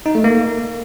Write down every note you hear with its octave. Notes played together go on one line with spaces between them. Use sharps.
D#4
A3
A#3